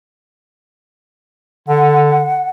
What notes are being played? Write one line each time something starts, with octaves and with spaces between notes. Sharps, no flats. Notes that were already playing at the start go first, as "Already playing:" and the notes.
D3 F#5